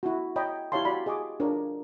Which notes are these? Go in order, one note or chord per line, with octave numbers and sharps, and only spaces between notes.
E4 F#4
C#5 D#5 G5 A#5 B5
E4 G4 C#5 F5 A5 C6
F#4 D5 B5
G#4 D#5 G#5 C#6 D6
D4 F4 G#4 A#4 C#5